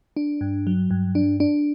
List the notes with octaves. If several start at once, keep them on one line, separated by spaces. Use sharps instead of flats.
D4
G2
F#3
G2
D4
D4